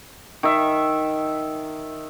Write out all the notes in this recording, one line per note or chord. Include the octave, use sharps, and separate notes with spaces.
D#3 E5